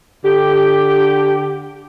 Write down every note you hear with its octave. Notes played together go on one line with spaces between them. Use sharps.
D3 G4